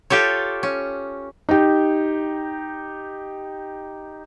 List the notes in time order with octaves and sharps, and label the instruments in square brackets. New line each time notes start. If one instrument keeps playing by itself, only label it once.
[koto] F4 G4 A4 C#5
C#4
[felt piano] D#4 G4